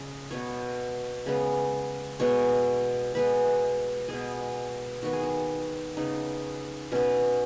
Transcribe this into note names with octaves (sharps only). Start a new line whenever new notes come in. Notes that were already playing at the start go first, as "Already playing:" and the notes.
Already playing: C#3 D#5
B2 B3 C#5
C#3 G#3 B3
B2 G#3 B3 C#5
B2 G#3 B3 B4
B2 G#3 B3 G#4
D#3 B3 F#4
G#4
F#4
C#3 B3 D#4
B2 B3 C#4